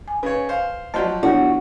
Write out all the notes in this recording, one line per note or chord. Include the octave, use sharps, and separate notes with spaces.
G#5
C#3 B4 C#5
C5 F5
F3 F#3 D5 D#5 A5 C6 G6
B3 D4 E4 F#4 A4 C#5